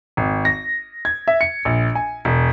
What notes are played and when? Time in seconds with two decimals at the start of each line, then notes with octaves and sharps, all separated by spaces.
0.17 G#1
0.45 A#6
1.05 G#6
1.28 E5
1.41 C#7
1.65 A#1
1.95 G#5
2.25 E1